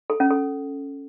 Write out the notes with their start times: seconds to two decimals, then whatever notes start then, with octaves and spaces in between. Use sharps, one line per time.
0.10 A4
0.20 C#4
0.31 A4